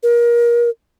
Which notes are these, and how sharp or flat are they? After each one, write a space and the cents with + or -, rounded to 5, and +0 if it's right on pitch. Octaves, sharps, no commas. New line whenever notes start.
A#4 +25